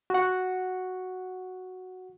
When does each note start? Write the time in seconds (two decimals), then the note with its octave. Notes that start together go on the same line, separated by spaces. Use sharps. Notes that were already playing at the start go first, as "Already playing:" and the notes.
0.10 F#4 F#5